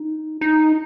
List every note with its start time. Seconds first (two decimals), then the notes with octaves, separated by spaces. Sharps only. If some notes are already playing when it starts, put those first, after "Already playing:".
Already playing: D#4
0.41 D#4